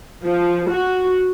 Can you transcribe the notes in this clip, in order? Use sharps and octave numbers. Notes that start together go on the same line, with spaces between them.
F3
F#4